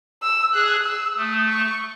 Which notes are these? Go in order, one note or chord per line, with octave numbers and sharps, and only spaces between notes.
E6
G#4 F#6
E6
A3 D#6
C#6